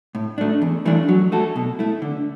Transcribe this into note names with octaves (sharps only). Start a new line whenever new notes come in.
A2
A3 D4
E2
E3 A3 D4
F#3
A3 F#4 A4
B2
A3 E4
D3